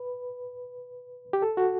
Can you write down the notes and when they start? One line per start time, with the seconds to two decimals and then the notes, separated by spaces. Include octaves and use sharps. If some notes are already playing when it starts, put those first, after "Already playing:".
Already playing: B4
1.33 G4
1.42 A4
1.57 F#4